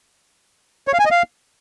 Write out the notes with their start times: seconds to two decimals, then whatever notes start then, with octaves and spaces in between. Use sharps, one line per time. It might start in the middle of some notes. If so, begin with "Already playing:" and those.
0.88 C#5
0.94 F5
0.99 G#5
1.05 D#5
1.11 F5